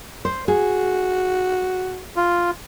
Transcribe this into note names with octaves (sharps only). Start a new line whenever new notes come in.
C5
F#4 G#4
F4